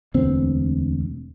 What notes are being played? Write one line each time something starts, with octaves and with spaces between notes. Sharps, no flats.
E1 D2 B3 C4